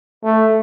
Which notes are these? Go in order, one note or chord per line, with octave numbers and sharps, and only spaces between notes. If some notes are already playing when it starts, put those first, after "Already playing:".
A3